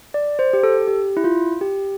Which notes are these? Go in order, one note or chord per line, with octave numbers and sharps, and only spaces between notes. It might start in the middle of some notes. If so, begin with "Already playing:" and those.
D5
C5
G4
A4
G4
E4
F4
G4